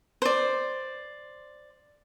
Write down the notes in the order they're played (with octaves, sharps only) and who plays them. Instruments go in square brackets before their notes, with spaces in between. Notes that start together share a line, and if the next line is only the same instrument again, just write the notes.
[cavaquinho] C5 D5